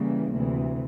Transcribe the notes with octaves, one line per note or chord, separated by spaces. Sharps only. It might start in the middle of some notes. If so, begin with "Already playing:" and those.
Already playing: C#3 E3 G3 A#3
D2 C3 E3